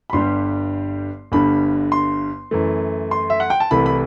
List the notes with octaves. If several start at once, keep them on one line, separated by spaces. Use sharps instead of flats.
B5
G1 G2 D3 G3 C6
G1 G2 D3 B5
C6
F#2 E3 A3
C6
E5
F#5
G5
A5
C2 C3 E3 A3 B5
B5